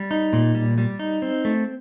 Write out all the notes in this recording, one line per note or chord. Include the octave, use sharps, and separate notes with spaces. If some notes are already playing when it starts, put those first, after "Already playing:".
Already playing: G3
D#4
A#2
G3
G3
D#4
C4
A3